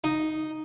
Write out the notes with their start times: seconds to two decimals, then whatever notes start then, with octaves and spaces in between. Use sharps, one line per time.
0.04 D#4